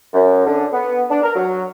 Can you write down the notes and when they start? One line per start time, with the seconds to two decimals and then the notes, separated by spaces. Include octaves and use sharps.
0.13 F#2
0.47 D3
0.73 B3
1.10 D4
1.23 A#4
1.36 F#3